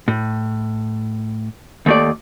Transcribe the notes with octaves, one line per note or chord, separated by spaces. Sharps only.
A2
D#2 A3 D5